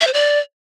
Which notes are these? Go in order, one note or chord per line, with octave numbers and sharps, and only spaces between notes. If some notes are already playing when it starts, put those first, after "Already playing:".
E5
C5
D5